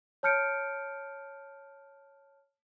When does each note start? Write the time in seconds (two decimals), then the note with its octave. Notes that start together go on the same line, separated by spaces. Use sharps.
0.23 C#5 A5 F6 G6 C#7 D7